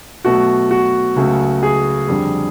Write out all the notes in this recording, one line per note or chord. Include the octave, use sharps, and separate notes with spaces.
B2 F#3 A3 F#4
F#4
C#2 C#3 F#3 A3
G#4
F2 D3 G3